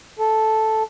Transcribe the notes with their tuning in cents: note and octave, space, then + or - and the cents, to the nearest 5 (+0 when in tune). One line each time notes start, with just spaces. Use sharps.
A4 -5